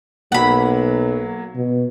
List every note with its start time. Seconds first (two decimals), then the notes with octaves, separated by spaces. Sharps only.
0.32 B1 F#3 A#3 F#5 B5
1.56 B2